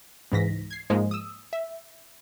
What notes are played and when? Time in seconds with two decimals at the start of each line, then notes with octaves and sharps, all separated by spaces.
0.32 C#2 G#2 E3 A#6 B6
0.71 G#6 C7
0.90 G#2 F3 G#3 A#3
1.11 D#6 E6
1.53 E5